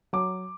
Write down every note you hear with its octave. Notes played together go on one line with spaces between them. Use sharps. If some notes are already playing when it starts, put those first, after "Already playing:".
F#3 D6